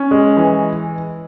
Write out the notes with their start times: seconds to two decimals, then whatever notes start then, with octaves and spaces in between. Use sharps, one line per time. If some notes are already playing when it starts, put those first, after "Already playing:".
Already playing: C#4
0.11 G#3
0.37 E3